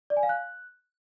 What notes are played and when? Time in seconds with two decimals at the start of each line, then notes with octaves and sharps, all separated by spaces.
0.10 D5
0.17 G#5
0.23 F5
0.29 F#6